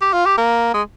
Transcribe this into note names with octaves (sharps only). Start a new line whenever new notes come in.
G4
F4
G4
A#3
G#3